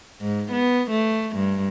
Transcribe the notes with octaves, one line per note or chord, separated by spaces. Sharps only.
G#2
B3
A3
G2